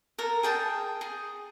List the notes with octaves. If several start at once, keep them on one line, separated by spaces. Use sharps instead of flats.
A4 A#4
G#4 G5 A5
G#4